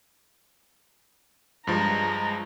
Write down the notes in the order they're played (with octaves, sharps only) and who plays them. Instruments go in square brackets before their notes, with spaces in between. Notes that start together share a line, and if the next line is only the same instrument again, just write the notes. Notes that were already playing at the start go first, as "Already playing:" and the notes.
[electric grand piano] G2 F3 G#3 [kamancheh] A#5